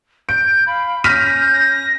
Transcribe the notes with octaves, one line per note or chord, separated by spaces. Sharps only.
G6 D7
F5 B5
C#4 F6 G6 A#6 B6 D#7
A#6